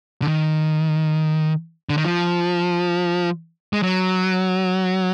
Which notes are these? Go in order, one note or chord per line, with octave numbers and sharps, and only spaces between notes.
D3
D#3
D3
D#3
F3
G#3
F#3